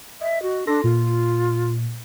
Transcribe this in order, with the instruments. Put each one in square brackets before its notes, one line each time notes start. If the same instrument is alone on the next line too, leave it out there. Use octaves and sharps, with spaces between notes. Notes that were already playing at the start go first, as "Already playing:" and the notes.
[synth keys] D#5 [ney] E5
[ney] F#4
[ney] D4 [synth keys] A4 C6 A#6
[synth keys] A#2 [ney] F4